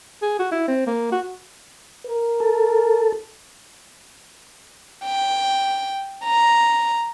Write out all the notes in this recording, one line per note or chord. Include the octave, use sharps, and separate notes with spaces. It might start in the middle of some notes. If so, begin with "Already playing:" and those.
G#4
F#4
E4
C4
A#3
F#4
A#4
A4
G5
A#5